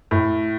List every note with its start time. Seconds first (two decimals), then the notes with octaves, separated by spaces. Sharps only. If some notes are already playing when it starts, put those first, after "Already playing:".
0.11 A2